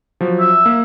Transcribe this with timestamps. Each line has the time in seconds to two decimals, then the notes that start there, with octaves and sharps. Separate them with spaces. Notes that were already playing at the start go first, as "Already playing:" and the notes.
0.21 F3 F#3
0.40 E5
0.66 A#3